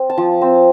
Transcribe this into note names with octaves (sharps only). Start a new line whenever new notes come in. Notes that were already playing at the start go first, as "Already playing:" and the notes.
Already playing: C4
A5
F3
C4